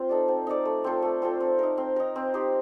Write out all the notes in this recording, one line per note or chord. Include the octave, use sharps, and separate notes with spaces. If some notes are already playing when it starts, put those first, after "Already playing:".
Already playing: C4 F4
D#4 A4 D5
C4
D#4 A4 D5
A3
C4 F4 A4
A3
C4 F4 A4
C4
D#4 A#4
C4
D#4 A#4
C4
D#4 G4 C5